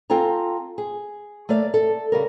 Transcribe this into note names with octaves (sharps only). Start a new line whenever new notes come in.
C4 F4 A4 G#5 A#5
G#4
A3 A#3 D5 F5
A4
C#3 G3 A#4